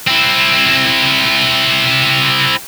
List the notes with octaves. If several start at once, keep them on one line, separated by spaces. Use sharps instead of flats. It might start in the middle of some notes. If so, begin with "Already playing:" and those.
C4 E4